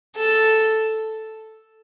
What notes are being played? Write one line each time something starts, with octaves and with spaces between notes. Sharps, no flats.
A4